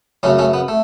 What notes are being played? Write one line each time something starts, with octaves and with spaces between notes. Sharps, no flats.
F#2 C#3 A3 C#4
A3 C#4
B3
A3